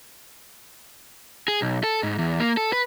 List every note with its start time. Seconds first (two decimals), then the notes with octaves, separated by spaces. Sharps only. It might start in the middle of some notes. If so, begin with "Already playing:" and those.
1.48 G#4
1.62 B1
1.84 A4
2.03 G#2
2.19 E2
2.40 A#3
2.57 A4
2.73 B4